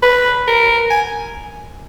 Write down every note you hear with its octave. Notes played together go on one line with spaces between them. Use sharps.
B4
A#4
G#5